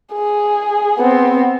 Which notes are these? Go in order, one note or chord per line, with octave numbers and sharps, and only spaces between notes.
G#4
B3 C4